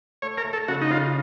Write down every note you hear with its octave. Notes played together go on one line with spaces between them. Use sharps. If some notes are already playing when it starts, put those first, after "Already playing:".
A3 C#5
A#4
A3
A4
C#3 F#4
D#4
C#3 F4